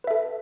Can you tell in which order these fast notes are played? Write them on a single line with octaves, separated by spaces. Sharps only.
B4 E5 A4